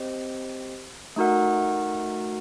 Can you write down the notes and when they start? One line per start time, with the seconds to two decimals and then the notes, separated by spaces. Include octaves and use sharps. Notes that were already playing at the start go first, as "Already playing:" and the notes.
Already playing: C4 G4 C5 D#5
1.16 A3 D#4 F#4 A#4 F#5